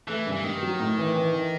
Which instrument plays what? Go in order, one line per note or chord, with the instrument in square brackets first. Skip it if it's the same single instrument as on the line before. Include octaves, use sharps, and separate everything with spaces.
[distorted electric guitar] E3 [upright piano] A3
[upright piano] G2
[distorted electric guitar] E3
[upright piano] G2 [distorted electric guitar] D#3
[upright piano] F#3
A2
E3
E3
E3